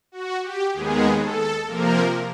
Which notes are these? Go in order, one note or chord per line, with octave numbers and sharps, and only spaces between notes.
F#4
G4
D#2 D#3 G#3 B3 G#4
A4
C3 F3 A#3 A#4